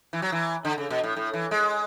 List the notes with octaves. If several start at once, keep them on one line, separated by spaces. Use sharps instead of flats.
E3
F#3
E3
D3
C#3
B2
A2
A2
E3
G#3